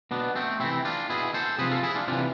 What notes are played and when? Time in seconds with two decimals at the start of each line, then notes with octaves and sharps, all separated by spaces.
0.11 B2 B3 D4
0.36 A3 C4
0.60 C3 E3 C4 E4
0.85 D4 F4
1.10 B2 E4 G#4
1.34 A4 C5
1.58 C3 F3 G#4 B4
1.71 F4 A4
1.83 E4 G#4
1.95 D4 F4
2.08 C3 E3 D4 F4